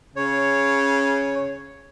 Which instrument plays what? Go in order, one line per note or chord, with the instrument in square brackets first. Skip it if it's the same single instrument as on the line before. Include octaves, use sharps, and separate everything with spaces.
[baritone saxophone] C#3 [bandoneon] C#5